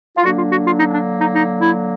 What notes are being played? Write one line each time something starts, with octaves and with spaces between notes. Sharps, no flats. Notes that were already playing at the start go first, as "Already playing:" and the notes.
F4
D3 F#3 A#3 D4 F#4
F4
F#4
F4
D#4
D4
D#4
D#4
E4